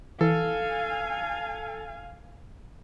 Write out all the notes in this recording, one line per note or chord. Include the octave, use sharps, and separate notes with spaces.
E3 A4 F5 G#5